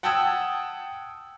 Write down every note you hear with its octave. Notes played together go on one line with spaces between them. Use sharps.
F#5 G5 A5 D#6 E6 G#6